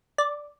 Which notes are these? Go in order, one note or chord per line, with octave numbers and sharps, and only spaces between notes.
D5